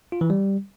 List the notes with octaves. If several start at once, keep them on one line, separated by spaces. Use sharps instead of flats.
F4
E3
G3